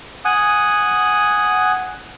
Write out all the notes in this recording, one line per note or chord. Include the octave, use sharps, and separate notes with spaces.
F#5 G#5 D#6